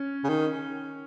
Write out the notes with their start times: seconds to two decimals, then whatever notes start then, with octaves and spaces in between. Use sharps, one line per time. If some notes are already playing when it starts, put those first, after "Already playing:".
Already playing: C#4
0.24 C#3
0.29 D#3